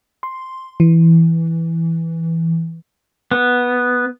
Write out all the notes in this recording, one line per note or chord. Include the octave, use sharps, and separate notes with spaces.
C6
E3
B3